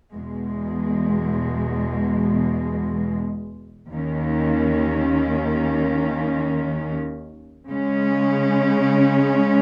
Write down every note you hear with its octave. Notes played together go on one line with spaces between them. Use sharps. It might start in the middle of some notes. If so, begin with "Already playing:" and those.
E2 B2 G#3
D#2 D#3 A#3 C#4
C#3 G#3 C#4